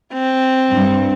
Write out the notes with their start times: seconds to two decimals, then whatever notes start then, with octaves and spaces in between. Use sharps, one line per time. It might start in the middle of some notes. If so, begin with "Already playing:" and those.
0.13 C4
0.71 G2